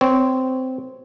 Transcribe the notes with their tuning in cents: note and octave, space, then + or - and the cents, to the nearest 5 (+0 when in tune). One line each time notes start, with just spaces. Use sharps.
C4 -15 C#5 +0